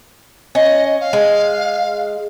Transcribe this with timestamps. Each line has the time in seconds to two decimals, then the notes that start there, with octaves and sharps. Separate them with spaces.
0.55 C#4 D#5
1.00 F5
1.13 G#3